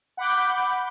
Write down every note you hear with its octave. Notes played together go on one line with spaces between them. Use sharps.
F#5 B5 D6 G6